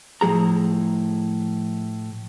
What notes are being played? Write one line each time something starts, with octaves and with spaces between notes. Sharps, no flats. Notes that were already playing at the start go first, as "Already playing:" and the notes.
A2 F3 G#3 G#4 A#5